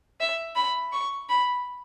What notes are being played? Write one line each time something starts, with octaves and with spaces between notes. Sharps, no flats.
E5
B5
C#6
B5